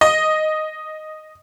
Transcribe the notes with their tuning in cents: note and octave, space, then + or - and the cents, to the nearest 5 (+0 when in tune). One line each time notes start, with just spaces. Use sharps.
D#5 +0